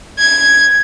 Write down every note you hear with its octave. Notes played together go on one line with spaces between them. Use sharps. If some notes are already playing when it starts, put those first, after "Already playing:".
G#6